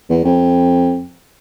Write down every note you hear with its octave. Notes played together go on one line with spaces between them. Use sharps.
E2
F2